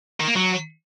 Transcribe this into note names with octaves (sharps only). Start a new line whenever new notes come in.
D#3
A#3
F#3